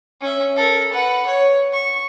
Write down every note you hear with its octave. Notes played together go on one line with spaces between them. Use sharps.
C#4 E5
A4 A#4
B4 F#5
C#5
C#6